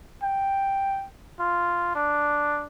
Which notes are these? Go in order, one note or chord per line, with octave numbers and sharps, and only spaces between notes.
G5
F4
D4